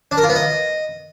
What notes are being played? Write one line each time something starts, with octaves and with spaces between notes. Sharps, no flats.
D4
A#4
F4
B3
D#5